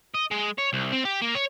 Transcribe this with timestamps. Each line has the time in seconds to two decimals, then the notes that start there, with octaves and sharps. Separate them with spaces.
0.14 D#5
0.31 G#3
0.58 C#5
0.73 C2
0.92 C4
1.05 G4
1.21 A#3
1.35 C#5